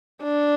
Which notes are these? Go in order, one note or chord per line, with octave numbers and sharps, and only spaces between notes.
D4